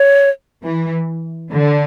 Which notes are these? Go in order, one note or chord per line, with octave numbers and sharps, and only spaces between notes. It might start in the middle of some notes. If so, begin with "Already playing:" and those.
Already playing: C#5
E3
D3